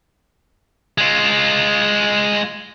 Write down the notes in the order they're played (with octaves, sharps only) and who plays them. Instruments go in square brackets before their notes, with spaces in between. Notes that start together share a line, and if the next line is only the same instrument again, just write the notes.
[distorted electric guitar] G#3 F4